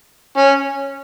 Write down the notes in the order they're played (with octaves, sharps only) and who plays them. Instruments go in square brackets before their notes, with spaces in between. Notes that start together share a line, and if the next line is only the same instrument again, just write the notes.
[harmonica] C#4